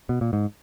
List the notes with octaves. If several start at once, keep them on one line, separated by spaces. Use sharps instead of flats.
B2
A#2
G#2